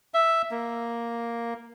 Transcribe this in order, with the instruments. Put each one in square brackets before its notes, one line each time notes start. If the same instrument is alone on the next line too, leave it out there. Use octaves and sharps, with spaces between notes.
[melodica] E5
A#3